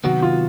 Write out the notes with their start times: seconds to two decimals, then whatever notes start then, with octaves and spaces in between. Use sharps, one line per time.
0.04 C3 D#3 F#3 B3 F#4
0.22 F4